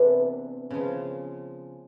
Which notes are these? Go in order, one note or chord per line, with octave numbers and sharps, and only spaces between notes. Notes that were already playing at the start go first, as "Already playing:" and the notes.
Already playing: C3 E3 G#3 B3 D4
C#3 F3 G#3